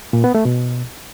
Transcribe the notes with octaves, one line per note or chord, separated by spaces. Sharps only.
A#2
B3
A3
B2